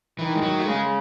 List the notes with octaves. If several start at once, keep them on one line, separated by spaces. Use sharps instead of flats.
D#3 E3
G#3
F#3
A3
C#3 G#3